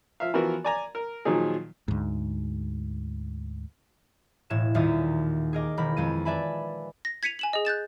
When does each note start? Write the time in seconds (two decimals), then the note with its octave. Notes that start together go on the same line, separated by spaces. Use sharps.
0.20 F3 E5 F5
0.34 E3 F3 B3 F#4 A#4
0.65 D5 G#5 A#5
0.95 A#4
1.25 A#2 D#3 F3 F#3 D#4 G#4
1.88 D2 G#2
4.50 E1 A2 G#6 E7
4.74 D#1 D#2 A#3 F4 E5 D#6
5.53 G#4 A#4 D#5 D6
5.77 E1 D#3 A#4 B5
5.97 F2 G#3 D#7
6.25 B4 D5 E5 G#5 A5 B5
7.05 A#6
7.23 G#6 B6 C#7 D#7 F7
7.39 G#5 E7 F#7
7.53 G#4 D#5
7.65 F#6 G6 A6 E7